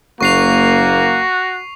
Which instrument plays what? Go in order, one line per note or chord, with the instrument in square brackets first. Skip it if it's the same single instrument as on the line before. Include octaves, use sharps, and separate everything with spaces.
[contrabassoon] F#1 [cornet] A#3 [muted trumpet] F#4 [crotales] C#6 C7 F7